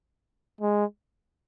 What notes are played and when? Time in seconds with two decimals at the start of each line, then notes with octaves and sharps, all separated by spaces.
0.61 G#3